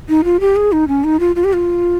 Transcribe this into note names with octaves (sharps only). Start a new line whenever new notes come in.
D#4
F4
G4
G#4
D#4
C#4
D#4
F4
F4
G4
F4